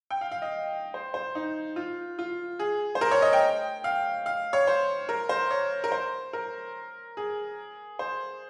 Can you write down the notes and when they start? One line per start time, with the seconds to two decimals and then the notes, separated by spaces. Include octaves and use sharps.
0.11 G5
0.21 F5
0.31 F5
0.42 D#5
0.94 C5
1.14 C5
1.35 D#4
1.76 F4
2.19 F4
2.59 G#4
2.95 C5
3.01 A#4
3.11 C#5
3.22 D#5
3.33 G5
3.84 F5
4.26 F5
4.53 C#5
4.67 C5
5.09 A#4
5.29 C5
5.51 C#5
5.84 A#4
5.92 C5
6.33 A#4
7.17 G#4
7.99 C5